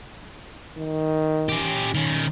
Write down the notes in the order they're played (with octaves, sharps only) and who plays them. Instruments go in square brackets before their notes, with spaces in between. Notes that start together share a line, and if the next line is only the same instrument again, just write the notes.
[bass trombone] D#3
[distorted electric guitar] C#4 G4
D#3 C#4